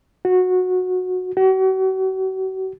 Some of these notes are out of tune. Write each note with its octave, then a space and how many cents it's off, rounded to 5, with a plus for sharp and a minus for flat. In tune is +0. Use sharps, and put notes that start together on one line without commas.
F#4 -15
F#4 +40